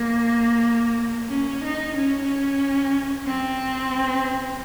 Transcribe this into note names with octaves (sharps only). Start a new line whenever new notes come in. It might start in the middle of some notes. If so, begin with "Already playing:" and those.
Already playing: A#3
C#4
D#4
C#4
C4